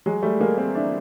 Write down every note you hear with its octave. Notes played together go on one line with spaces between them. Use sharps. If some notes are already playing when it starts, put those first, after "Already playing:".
F#3 G#3
G3 A3
G#3 A#3
A#3 C4
D4 E4